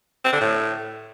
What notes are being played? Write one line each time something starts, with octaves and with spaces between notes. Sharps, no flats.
C4
D3
A2